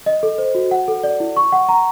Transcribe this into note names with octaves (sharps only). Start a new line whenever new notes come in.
D#5
A4
C5
F#4
F#5
A4
D5
E4
C#6
F#5
A#5